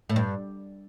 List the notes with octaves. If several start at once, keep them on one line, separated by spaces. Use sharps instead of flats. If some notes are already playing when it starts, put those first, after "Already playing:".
A2
G2